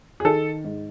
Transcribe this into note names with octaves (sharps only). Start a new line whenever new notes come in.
G#4
D#3 A4
G#2